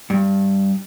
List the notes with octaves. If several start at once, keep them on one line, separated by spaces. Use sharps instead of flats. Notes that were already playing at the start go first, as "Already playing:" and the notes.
G2